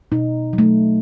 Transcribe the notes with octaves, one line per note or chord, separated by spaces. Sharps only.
B2 D#4
F#3
A3